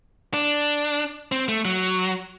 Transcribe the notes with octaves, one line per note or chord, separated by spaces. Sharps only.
D4
C4
A3
F#3